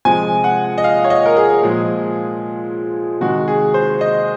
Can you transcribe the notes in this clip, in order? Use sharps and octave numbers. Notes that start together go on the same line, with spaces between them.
C3 F3 G#3 G#5
F#5
D#5
F5
C#5
D#5
A#4
G#4
A#2 F3 G#3
C3 D#3 G#3 F#4
G#4
C5
D#5